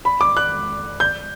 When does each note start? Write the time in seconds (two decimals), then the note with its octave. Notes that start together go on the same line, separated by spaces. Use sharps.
0.05 B5
0.21 D6
0.37 F#6
1.00 G6